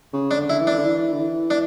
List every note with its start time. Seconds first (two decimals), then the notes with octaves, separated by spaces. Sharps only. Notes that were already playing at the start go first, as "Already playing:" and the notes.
0.13 C#3
0.31 D4
0.37 D3
0.50 E4
0.61 E3
0.67 D4
0.78 D3
0.85 E3
1.12 D3
1.20 E3
1.50 D4